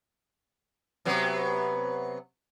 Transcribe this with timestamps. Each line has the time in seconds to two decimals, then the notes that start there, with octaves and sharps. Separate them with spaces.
1.05 C3 F#3 B3